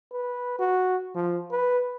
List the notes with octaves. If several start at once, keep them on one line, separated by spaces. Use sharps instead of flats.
B4
F#4
F3
B4